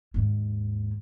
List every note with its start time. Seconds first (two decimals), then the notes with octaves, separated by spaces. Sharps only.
0.14 D#2 G#2